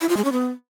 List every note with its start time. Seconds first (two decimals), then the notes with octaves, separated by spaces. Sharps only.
0.01 E4
0.09 F4
0.17 G#3
0.24 C#4
0.32 B3